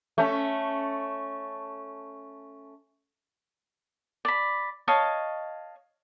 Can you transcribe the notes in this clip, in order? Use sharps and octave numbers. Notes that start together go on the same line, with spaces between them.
A3 C#4
D5 B5
C#5 D#5 F5 A5